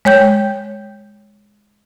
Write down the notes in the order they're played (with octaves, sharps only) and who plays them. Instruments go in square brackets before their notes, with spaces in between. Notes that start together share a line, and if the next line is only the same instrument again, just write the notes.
[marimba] G#3 C#5 G5 G6